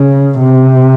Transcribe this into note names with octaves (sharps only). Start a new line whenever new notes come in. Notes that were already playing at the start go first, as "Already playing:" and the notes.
Already playing: C#3
C3